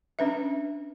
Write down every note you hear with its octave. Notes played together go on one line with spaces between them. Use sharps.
C#4 D4 B4 E5